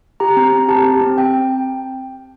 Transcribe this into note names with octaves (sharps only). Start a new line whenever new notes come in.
G4 A#5
C4
C4
A#5
G4 A5
G4
C4
C4 G5